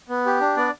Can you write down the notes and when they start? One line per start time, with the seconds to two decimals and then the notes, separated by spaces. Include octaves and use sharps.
0.09 B3
0.26 G4
0.41 D4
0.56 B3 D5